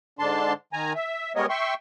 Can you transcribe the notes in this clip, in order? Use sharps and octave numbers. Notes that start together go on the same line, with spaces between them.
G#2 D3 D4 A5 C6
D#3 G#5 A#5
E5
G3 G#3 B3 A#4 C#5 D#5
E5 G5 C6 C#6